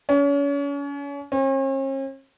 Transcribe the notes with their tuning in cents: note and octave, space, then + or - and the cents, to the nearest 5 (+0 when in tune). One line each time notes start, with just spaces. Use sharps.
C#4 +35
C#4 -45